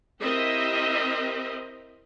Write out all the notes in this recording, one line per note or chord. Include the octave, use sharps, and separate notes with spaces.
C4 E4 G4 A#4 D#5 E5